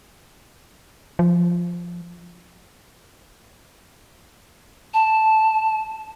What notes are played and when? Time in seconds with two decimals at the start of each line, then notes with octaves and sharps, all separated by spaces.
1.19 F3
4.94 A5